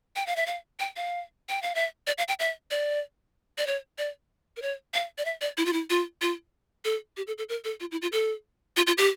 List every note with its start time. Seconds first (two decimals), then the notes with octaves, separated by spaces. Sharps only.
0.16 G5
0.27 F5
0.36 E5
0.46 F5
0.79 G5
0.96 F5
1.49 G5
1.62 F5
1.75 E5
2.07 D5
2.18 F5
2.28 G5
2.40 E5
2.71 D5
3.58 D5
3.67 C#5
3.98 D5
4.57 A#4
4.62 C#5
4.94 F5
5.18 D5
5.25 E5
5.41 D5
5.57 E4
5.66 F4
5.73 E4
5.90 F4
6.21 F4
6.85 A4
7.17 G4
7.27 A4
7.38 A4
7.49 A#4
7.64 A4
7.80 F4
7.91 E4
8.02 F4
8.12 A4
8.77 F4
8.87 F4
8.98 G4